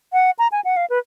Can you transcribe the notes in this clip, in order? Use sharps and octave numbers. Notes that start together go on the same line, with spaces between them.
F#5
A#5
G#5
F#5
F5
B4